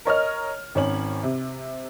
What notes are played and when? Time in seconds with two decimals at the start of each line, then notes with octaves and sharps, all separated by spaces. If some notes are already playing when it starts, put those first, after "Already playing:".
0.05 A#4 C#5 D#5 F6
0.75 G#1 C#4 F#7
1.23 C3